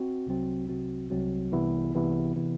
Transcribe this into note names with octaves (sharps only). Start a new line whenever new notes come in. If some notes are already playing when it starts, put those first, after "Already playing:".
Already playing: C4 F#4
C2 C3 F#3 C4 F#4
C2 C3 F#3 C4 F#4
C2 C3 F#3 C4 F#4
C2 C3 E3 B3 E4
C2 C3 E3 B3 E4
C3 E3 B3 E4